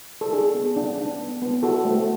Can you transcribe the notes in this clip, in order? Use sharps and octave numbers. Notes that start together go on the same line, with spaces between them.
A4
D4 G#4
B3
D4
D4
B3
B3
F#4 A4
A3